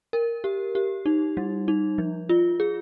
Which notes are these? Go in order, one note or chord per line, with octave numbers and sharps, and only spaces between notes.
A#4
G4
G4
D#4
G3
D#4
F3
F4
G#4